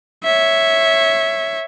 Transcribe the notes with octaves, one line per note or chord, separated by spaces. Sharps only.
C#5 E5